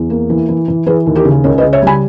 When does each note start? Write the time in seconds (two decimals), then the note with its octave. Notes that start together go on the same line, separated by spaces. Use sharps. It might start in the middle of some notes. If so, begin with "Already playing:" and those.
Already playing: E2
0.10 A#3
0.30 E3
0.49 E3
0.68 E3
0.86 E3 G#4 B4
1.06 D#2
1.15 G4 A#4
1.25 C#3
1.44 C#2 A#4 C#5
1.58 B4 D#5
1.63 C#3
1.73 C#5 E5
1.82 G3 G#5 B5